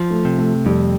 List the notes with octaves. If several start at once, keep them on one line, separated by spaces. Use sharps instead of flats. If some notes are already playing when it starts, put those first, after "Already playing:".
Already playing: F3
A3
C3
A3
F2 G3